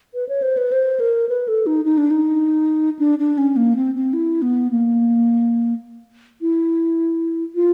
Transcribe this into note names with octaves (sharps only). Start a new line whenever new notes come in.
B4
C#5
C5
B4
C5
A#4
B4
A4
D#4
D#4
D4
D#4
D4
D4
C#4
A#3
C4
C4
E4
B3
A#3
E4
F4